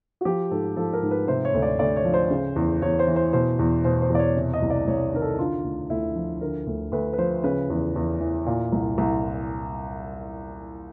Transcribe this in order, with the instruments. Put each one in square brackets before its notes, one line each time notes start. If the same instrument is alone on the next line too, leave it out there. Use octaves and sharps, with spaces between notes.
[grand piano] F#4
F3 G4
G#2 A4
F3 A4
A#4
G#2
B4
C3 C5
C#5
D2
D5
D2 D5
C#5
F3
C5
C#3
E2
E2 C#5
C5
E3
C5
B2 C5
E2
B2 C5
C5
E2 D5
C#5
C3
D#5
C2
D5
C2 C#5
D#3 A#4
A4
D3 F4
D2
D2 E4
F3
D3 A#4
D2
D2 B4
B4
F3 C5
C#3 B4
E2
E2
E3
A#2
C2
C2